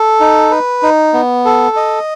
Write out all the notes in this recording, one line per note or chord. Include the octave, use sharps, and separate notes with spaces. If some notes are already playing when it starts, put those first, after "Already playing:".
Already playing: A4
D#4
B4
D#4
B3
A4
D#5